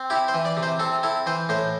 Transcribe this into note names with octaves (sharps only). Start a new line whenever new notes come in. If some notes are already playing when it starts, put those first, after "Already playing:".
Already playing: C4
E4 G4
C5
E3
D5
C3
C5
C4 A4
E4 A4
E3 C5
A2 C5